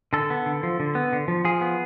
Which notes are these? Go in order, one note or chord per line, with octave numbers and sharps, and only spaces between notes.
D3 A4
B3
D3
F3
D3
B3
D3
F3
F3 G#4
B3